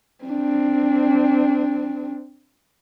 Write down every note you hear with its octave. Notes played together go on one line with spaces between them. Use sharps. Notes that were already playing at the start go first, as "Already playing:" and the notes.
C4 D4